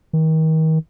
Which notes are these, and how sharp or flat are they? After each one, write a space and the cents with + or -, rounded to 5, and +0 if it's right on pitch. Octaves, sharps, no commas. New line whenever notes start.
D#3 +35